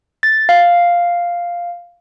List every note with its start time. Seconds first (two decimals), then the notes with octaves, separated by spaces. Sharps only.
0.23 A6
0.49 F5